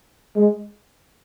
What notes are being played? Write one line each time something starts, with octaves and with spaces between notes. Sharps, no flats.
G#3